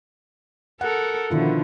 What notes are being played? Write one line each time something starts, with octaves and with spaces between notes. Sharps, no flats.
A4 A#4 F#5
B2 D3 D#3 F3 E4 F4